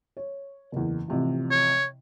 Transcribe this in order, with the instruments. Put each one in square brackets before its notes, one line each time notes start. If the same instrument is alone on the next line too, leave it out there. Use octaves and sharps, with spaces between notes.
[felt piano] C#5
F#1 E2
A1 C3 F3
[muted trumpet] C#5